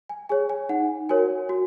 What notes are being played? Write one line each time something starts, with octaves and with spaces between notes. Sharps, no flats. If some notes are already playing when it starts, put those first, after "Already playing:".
G#5
G#4 C#5 G#5
G#5
D#4 F#5
F#4 A#4 C#5 G#5
F#4